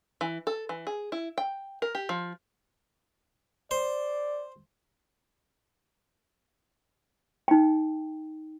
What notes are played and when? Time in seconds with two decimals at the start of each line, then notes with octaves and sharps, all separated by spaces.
0.21 E3
0.47 A4
0.69 E3
0.87 G#4
1.12 E4
1.38 G5
1.82 A#4
1.95 G4
2.09 F3
3.71 C5 D5
7.48 D#4 G5